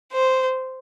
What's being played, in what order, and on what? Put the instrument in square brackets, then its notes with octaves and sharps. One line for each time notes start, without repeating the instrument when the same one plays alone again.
[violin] C5